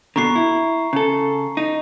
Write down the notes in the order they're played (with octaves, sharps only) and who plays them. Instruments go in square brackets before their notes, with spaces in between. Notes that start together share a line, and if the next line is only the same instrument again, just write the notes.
[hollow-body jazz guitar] B2 D3 [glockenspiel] A#5 C#6 C7
[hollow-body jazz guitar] E4
C#3 A4
D#4